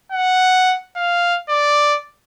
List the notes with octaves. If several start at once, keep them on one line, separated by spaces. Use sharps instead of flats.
F#5
F5
D5